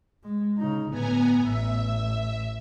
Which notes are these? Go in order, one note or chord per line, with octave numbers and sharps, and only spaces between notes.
G#3
C#3 D#4
G1 A2 B3 G#5 A#5
A1 E5